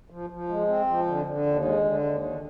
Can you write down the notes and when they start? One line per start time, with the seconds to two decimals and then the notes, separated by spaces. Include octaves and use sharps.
0.10 F3
0.30 F3
0.49 G#3
0.67 C4
0.87 F3
1.06 D3
1.26 D3
1.46 D#2
1.65 G#3
1.85 D3
2.04 D#2
2.23 D3